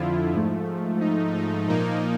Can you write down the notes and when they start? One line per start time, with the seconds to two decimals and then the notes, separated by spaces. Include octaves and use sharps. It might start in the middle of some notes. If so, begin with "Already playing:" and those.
Already playing: F2 D3 F3 E4 F4
0.34 G#2 F3 A3
1.01 D#4
1.35 D#4
1.68 A#2 F3 A#3 D#4